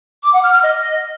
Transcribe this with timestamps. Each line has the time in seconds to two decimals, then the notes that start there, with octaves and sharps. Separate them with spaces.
0.23 D6
0.33 F#5
0.43 F6
0.53 F6
0.63 D#5